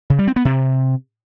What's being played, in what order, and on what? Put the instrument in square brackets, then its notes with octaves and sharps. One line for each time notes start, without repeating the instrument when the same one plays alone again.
[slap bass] C#3
G3
C4
B3
C3